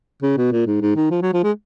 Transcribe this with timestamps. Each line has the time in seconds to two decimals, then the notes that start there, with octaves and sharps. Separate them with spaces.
0.23 C#3
0.37 B2
0.52 A#2
0.67 G#2
0.82 G#2
0.96 D#3
1.11 F3
1.22 F#3
1.33 F3
1.44 G#3